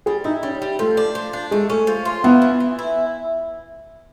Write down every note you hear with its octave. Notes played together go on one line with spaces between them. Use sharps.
G3 G#4
D#4 E4
G3 C#4
G3
F3 A3
D4
F3
D4
G#3 A3
A3 C#4
F3
F4
B3 E4
E3
E3
E4